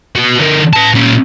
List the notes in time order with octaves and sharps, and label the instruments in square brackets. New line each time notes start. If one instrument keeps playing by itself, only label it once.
[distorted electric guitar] F#4 B4
D3 A#4
B4 A5
A#2 C#4